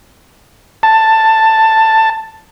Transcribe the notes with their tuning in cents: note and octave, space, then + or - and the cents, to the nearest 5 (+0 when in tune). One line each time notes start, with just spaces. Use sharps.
A5 +10